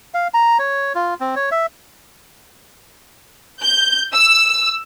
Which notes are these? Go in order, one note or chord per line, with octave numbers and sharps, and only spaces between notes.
F5
A#5
C#5
F4
C4
C#5
E5
G6
E6